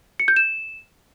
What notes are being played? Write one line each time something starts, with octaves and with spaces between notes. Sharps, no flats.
C#7
G6
E7